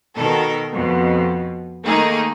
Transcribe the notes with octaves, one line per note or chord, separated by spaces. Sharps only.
B2 D#3 A4 A#4
F2 B2
D#3 A3 A#3 D#4 G#4